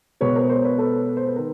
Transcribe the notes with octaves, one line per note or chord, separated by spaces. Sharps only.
B2 G#3 B4 C#5
A#4 C5
A#4 C5
B4 C#5
A4 B4
C5
B4
D#3 A#4